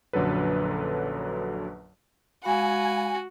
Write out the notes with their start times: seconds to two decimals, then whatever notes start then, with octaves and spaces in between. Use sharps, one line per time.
0.13 A#1 F#2 D3 F#3 A4 B4
2.44 G#3 F#4 F5 G#5 B5